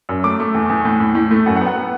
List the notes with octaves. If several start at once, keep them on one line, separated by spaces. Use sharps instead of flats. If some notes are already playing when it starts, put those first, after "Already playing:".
F#2
A3 D6
A3
E2
E2
A2
A2
A2
A3
F#2 F#5
F#5
B3
F#5
B3